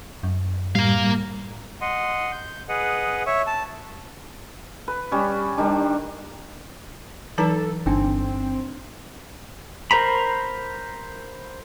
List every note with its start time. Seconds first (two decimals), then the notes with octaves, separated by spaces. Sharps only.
0.23 F#2
0.75 A2 G3 A#3 F5
1.81 D#5 F#5 C6
2.32 G6
2.69 G#4 B4 D#5 F#5
3.27 C#5 E5 C#6
3.47 A5
4.88 B4
5.12 G3 C#4
5.58 D#3 G3 D4
7.38 E3 F#3 D#4 A4 A5 A#5
7.86 G1 C4 D4 D#4 G5
9.91 A#4 C5 A#5 B5